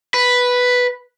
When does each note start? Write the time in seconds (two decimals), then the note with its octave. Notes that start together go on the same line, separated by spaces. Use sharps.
0.14 B4